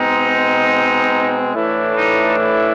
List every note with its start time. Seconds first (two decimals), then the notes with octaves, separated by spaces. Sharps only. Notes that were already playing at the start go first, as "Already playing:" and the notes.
Already playing: B2 G#3 C4 D#4
1.54 A2 E3 A3 D4 E4
1.95 D#4
2.37 E4